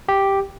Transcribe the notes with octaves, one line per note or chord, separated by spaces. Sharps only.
G4